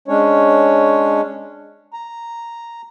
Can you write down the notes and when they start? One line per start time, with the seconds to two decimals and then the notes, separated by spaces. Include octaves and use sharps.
0.08 G#3 C#4 D4 C#5
1.94 A#5